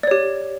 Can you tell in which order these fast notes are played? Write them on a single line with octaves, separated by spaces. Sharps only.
D5 C#5 G4